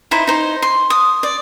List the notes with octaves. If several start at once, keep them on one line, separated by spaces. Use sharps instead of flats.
D#4 E4 C5
D#4 C5
C6
D#6
D5